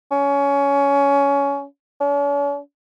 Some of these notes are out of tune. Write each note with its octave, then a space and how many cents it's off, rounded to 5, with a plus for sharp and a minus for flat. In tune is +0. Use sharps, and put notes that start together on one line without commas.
C#4 +20
C#4 +45